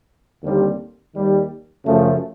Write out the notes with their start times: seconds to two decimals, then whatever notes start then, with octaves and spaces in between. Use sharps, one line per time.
0.42 D#2 D3 G3 C4
1.14 D#2 D#3 G3
1.86 F#2 C#3 F3 A3